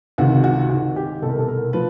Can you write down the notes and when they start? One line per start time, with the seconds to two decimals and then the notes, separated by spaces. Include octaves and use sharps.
0.18 C#2 C3 D#3 F#4
0.44 F#4
0.69 G#2 D#3 F#4
0.96 G4
1.22 C2 B2 A4
1.30 A#4
1.39 A4
1.48 A#4
1.73 F3 B4